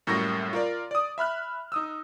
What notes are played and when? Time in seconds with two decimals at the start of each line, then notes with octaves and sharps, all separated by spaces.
0.07 F#2 A2 G3 A#3 C#6 A#6
0.53 F4 A#4 D5
0.91 D5 D#6
1.18 E5 B5 F6 F#6
1.72 D#4 D#6 E6